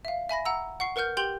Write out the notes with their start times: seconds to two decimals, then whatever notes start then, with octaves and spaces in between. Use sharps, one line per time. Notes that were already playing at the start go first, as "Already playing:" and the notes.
0.05 E5 F5
0.29 E5 G#5 B5 A#6
0.45 F#5 A#5 E6
0.80 F#5 C#6 C7
0.96 A#4 B4 F#5 F6 G6
1.17 G4 G5 C6 G6 F#7 G7